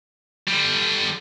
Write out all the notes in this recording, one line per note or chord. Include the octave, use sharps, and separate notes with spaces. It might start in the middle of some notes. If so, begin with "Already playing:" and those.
D3 G3